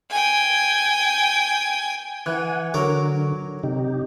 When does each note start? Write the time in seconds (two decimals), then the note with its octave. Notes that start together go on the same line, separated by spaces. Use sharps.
0.10 G5 G#5
2.26 E3 F#5 G#5
2.74 D3 F#3 A#4 D6
3.63 C3 D#4 G4